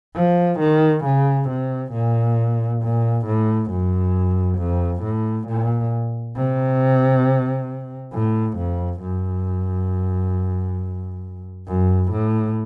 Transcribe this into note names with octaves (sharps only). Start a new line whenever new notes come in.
F3
D#3
C#3
C3
A#2
A#2
A2
F#2
F2
A2
A#2
C3
A2
F2
F#2
F#2
A2